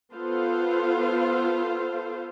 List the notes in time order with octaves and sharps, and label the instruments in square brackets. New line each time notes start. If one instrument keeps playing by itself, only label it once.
[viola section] B3 F4 A4 C5 F5